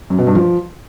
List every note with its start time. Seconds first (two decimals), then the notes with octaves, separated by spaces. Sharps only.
0.10 F#2
0.19 B2
0.27 G2
0.35 F3